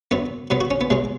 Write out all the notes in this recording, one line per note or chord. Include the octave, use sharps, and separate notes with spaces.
F#2 F#3 B3
B2 F#3 B3
F#4
C#4
B3
B2 F#3 G#3